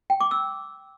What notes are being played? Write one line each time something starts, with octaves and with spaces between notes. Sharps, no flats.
G5
D6
E6